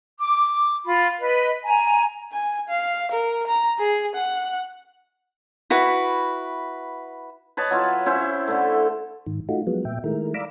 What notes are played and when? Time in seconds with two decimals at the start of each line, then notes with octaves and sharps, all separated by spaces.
0.18 D6
0.85 F4 B5
1.20 B4 D#5
1.64 G#5 A#5
2.32 G#5
2.69 F5
3.11 A#4
3.47 A#5
3.79 G#4
4.15 F#5
5.70 E4 F#4 B4
7.57 B4 C#5 D#5 A5
7.71 F#3 E4 F4 C#5
8.06 C#4 E4 C5 E5
8.48 D3 A3
9.26 G#2 D#3
9.49 A3 D#4 F4 F#4
9.67 F3 F#3 G#3 B3
9.85 A#2 E5 G5
10.04 D#3 G#3 A3 E4 A#4
10.34 D5 F5 A#5 B5 D6 E6